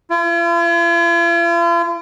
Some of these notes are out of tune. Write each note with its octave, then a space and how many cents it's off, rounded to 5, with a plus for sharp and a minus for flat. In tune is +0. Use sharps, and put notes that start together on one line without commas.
F4 -45